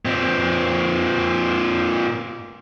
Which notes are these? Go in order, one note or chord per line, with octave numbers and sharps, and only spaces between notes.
A#2 C4